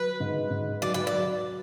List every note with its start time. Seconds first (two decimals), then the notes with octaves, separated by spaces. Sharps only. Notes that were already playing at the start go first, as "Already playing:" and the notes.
Already playing: F#3 B4
0.20 G#2
0.51 G#2
0.82 F#3 D5
0.94 B4
1.07 D5
1.12 F#3